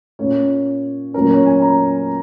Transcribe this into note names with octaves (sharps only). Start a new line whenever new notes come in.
A#2 A#3 C#4 C#5
A#2 F#3 C#4 A#4
C#5
G#5
A#5